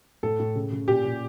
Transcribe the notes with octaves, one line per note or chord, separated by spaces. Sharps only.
A2 A4
A2
C#3
C#3
A#2 G4
A#2